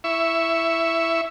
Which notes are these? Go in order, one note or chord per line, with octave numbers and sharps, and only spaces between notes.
E4 E5 C#6